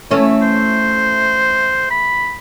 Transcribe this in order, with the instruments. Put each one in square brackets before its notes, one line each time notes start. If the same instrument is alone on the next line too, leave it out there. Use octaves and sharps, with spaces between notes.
[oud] E3 A3 C#4
[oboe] C5
B5